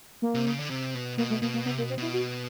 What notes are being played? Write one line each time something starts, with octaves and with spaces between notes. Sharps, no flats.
A#3
C3
C#3
D3
C3
B2
B2 A#3
A3
B2 A#3
A#3
C3 B3
A#3
B2
C4
B2 E4
F#4